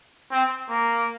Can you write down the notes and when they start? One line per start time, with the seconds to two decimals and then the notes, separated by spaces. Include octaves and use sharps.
0.31 C4
0.69 A#3